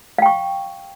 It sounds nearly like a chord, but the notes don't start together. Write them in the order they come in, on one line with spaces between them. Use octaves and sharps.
F5 G5 C#6